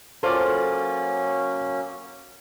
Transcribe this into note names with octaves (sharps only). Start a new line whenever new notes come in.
F#3 A#3 C#4 F4 A4 C5 D5